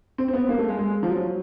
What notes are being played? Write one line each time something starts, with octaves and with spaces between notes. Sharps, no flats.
C4
C4
B3
A#3
A3
G#3
G#3
F3
F#3